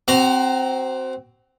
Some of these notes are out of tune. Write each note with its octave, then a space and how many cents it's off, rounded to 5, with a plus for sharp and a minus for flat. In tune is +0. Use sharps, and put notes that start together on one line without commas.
C4 +0 F#4 +30 A#5 +0